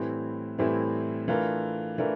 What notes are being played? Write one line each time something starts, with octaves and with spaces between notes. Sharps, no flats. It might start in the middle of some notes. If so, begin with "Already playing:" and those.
Already playing: A2 E3 G3 C4 E4
A2 E3 G3 C4 E4
E3 A3 D4 F4 A#4
E3 A3 D4 F4 A#4